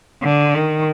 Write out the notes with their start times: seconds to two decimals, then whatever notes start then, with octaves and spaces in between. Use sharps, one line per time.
0.23 D3
0.55 D#3